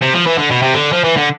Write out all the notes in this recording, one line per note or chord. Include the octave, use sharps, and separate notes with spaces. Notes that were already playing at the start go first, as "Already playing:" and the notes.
C3
F3
E3
D3
B2
C3
D3
F3
E3
D3